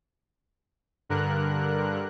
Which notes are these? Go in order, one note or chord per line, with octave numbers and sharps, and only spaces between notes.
G2 D3 A#4 F#6